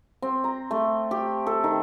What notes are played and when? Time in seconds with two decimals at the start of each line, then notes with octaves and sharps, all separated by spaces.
0.22 C4
0.44 A#5
0.71 A3
1.11 G4
1.47 A4
1.64 D#3